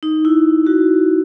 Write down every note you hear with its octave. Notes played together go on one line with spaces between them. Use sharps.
D#4
E4
F#4